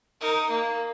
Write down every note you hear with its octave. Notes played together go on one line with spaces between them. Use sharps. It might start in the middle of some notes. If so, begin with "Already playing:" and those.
D#4 A#4
A#3